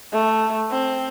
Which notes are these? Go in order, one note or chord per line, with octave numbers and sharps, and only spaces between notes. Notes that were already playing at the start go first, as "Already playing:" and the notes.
A3
C4